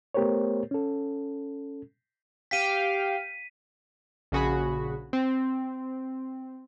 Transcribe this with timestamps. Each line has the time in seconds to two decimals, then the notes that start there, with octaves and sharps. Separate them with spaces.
0.14 A3 B3 G4 A#4 C5 C#5
0.71 C#4 A4
2.51 G4 F5 G5 B6 D#7
4.32 A#1 C#3 F#4 G#4 B5
5.13 C4